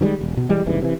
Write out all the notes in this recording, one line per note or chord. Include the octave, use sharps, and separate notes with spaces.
D#3 E3 G3 G#3
E1
B2
E3 G3 G#3
F#1 C2 G#2 E3
C3 E3